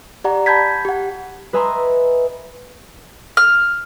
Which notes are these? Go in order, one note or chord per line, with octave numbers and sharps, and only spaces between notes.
G4 D5 F#5 A#5
A5 B5 G6 G#6 B6
G4 F#5
B4 D#5 E5 G#5 A#5 C6
F6